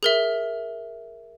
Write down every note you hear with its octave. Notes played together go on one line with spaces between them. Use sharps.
G#4 A#4 E5